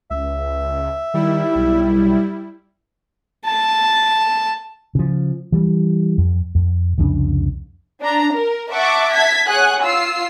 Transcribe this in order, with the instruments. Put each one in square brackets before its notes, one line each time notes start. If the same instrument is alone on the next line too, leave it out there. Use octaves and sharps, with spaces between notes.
[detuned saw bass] C#2 [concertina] E5
[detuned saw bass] D#3 [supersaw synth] G3 E4
[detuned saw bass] B1
[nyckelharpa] A5
[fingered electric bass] C#3 F3
E3 G3
F2
F2
C2 F2 C#3 D4
[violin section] D4 A#5
A#4
E5 F#5 A5 C#6 D6
A5 G#6 B6
G#4 C#5 F#5 G#5 F#6
F4 E6 C7